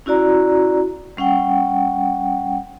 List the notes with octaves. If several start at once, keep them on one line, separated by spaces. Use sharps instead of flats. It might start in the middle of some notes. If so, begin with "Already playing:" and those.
C#4 E4 F#4 D5 A#5
G3 C#4 F#5 G5